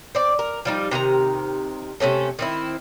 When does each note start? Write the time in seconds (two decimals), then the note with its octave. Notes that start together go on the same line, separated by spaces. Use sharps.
0.15 C4 D5
0.39 A#4
0.65 F3 G3 D#4
0.91 C3 D#3 F4 A#5
2.00 C3 A3 C#4 A4
2.39 D#3 C4 E4